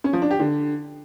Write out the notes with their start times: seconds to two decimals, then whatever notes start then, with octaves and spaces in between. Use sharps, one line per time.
0.04 C#4
0.13 F3
0.22 D4
0.31 G4
0.39 D3